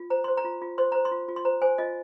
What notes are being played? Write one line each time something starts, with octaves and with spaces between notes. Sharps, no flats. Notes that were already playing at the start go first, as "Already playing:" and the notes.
Already playing: F4
C5 A#5
C5 C6
A#5
F4
F4
C5 C6
C5 A#5
C6
F4
F4
C6
C5 A#5
C5 G#5
F4 D#5